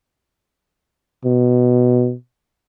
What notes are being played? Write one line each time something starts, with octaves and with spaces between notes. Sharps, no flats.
B2